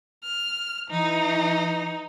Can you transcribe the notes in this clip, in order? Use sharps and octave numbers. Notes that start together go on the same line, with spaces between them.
F6
E3 D#4